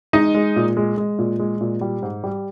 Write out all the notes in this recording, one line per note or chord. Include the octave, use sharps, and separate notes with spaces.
G#3 D#4 D#5
G#3
A#2
G#3
G#3
A#2
G#3
A#2
G3
G#2
G3